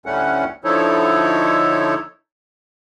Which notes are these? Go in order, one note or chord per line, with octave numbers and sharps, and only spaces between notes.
D2 A2 G3 A3 C#4 F#5
D3 F3 D#4 E4 A4 C#5